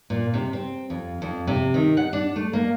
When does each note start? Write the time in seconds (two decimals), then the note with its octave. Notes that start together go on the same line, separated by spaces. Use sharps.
0.10 A#2
0.34 C3
0.53 C4
0.90 F2
1.22 F2
1.47 C3
1.74 D#3
1.97 F#5
2.13 D4
2.36 A3
2.53 A#3